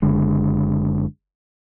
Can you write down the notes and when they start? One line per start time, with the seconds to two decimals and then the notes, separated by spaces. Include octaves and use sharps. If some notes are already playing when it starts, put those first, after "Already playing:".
0.02 F#1 D3 G#3